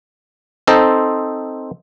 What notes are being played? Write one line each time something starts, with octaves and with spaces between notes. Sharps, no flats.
C4 D#4 A4 C5 D#5